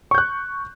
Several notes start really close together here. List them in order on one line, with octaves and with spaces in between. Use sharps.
C#6 G6 F#6